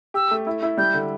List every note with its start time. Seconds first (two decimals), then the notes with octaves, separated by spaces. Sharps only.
0.14 G4 E6
0.31 A3
0.47 E4
0.62 E4
0.78 G3 G6
0.94 D3